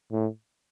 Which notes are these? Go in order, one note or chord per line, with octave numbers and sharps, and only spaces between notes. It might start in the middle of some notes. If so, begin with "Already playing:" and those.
A2